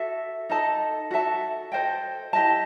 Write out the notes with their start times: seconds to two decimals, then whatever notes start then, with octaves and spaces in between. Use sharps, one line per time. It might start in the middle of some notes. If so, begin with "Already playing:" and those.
Already playing: F#4 A4 E5
0.49 D#4 A4 D#5 A5
1.11 F#4 A4 E5 A5
1.72 A4 C5 D#5 G5
2.33 E4 G4 D#5 A5